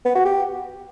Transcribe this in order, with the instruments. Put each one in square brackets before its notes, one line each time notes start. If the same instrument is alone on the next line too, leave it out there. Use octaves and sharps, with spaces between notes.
[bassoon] B3
F#4
G4